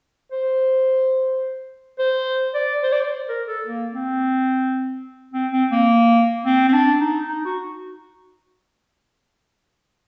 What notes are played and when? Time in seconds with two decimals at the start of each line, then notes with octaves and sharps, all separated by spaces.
0.32 C5
1.99 C5
2.54 D5
2.83 C5
2.92 D5
3.01 C5
3.29 A#4
3.48 A4
3.66 A#3
3.94 C4
5.34 C4
5.52 C4
5.71 A#3
6.45 C4
6.68 C4
6.73 D4
7.00 D#4
7.28 D#4
7.45 F#4